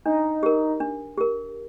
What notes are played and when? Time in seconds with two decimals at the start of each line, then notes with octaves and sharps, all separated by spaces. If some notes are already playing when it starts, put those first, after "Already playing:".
0.05 D4 D#4
0.43 G4 A#4
0.80 D4
1.18 G4 A#4